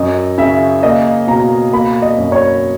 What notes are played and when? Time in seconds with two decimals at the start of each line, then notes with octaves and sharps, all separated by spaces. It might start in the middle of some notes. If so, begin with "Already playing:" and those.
Already playing: F#2 D#5
0.38 C#3 E5
0.83 A#3 D#5
1.27 B2 A#5
1.73 A#3 B5
2.02 D#5
2.18 F#2
2.32 C#5